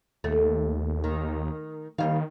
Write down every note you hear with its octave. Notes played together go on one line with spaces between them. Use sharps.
D#2 A3
D#3
D#2 D#3 G3 F5